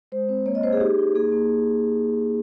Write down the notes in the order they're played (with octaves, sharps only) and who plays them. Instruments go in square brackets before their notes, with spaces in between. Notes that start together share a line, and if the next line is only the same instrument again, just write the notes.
[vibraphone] G#3 C5
C4
A#3 C#5
D#5
A#3 C5
G#4
D#4 G4
D#4
A#3 G#4
A#3